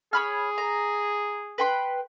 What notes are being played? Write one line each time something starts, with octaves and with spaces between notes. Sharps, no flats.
G#4 C#5 B5 F6
A#5
B4 G5 C6